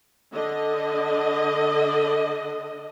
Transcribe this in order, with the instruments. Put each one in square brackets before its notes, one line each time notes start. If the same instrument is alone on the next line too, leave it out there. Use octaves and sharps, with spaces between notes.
[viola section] D3 D#5